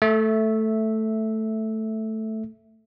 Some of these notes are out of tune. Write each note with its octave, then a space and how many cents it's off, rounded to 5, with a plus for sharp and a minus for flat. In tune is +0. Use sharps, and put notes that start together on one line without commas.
A3 +0 E5 -5